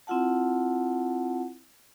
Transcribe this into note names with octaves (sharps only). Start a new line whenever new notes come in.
C4 E4 F4 F#5 A5